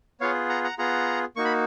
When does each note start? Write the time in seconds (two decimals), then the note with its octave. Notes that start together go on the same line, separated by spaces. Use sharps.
0.21 B3 F4 G#4 C#5 F5
0.49 F#5 A#5
0.64 F#5 A#5
0.78 B3 F4 G#4 F#5 A#5
1.36 A#3 D#4 F#4 C#6
1.45 B5